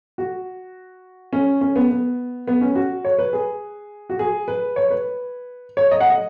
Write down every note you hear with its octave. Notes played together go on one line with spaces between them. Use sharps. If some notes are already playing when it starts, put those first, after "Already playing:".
F#4
C#4
C#4
B3
B3
B3
C#4
F#4
C#5
B4
G#4
F#4
G#4
B4
C#5
B4
C#5
D#5
F#5
D#5